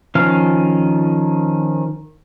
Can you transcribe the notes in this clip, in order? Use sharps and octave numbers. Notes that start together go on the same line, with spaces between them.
D#3 F3 C#4 F5